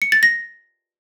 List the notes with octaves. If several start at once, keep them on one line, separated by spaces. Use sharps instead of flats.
C#7
A6
A#6